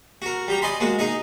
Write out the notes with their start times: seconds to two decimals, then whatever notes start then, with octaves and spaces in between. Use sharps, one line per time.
0.22 F#4 A#4
0.48 G3 G4 A#5
0.62 D5 D#5 G#5 B5 C6
0.80 G#3 A#3 F#4
0.99 D#4 G#4 D#5